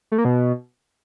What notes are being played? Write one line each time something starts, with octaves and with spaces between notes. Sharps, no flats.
A3
A#3
B2